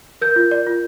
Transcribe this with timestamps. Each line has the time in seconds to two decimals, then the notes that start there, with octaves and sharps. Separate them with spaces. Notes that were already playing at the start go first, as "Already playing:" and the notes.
0.21 A#4 G6
0.36 F4
0.51 D5
0.67 F4